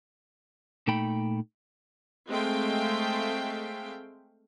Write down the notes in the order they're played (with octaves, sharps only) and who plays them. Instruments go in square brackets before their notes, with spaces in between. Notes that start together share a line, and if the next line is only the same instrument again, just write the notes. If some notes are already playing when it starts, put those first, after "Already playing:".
[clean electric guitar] A#2 A3 D#4 G5 B5
[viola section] G#3 A3 C4 E5 F5 G5